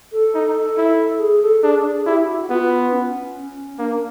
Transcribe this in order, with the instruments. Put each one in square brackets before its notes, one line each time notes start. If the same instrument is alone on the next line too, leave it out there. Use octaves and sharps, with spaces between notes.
[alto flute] A4
[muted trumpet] D#4
E4
[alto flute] G#4
A4
[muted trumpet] D4 [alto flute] G#4
[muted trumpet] E4 [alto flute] G4
[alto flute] F#4
F#4
[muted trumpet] B3 [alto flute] F4
[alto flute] C#4
[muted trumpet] A#3 [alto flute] D4